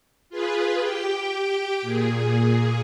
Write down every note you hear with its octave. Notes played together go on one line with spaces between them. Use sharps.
F4 G#4 B4
G4 G5
A#2 G#4